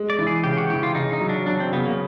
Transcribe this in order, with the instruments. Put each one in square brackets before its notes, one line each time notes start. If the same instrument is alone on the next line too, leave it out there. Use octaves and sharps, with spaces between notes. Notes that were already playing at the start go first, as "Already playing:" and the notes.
Already playing: [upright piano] G#3
[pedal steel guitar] D5
[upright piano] E3
[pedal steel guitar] G#4
[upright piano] C#3 [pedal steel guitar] G4
[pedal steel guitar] F#4
[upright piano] E3 [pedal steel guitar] G4
[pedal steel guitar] F4
[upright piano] C#3 [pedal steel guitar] D#4
[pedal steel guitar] D#4
[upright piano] F#3
[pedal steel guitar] D4
[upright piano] F#3 [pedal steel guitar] D4
[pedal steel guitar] C4
[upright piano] C#3 [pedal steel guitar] B3
[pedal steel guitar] A#3